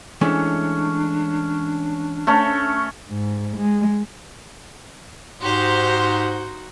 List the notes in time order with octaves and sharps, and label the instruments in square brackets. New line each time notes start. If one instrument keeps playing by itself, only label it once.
[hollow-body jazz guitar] E3 G#3 A3 [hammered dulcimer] C#4 [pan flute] D4
[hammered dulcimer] A3 C#4
[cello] G#2
G#3
[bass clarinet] G#2 [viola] D#4 F#4 [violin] G4 C5 [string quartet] C6 G6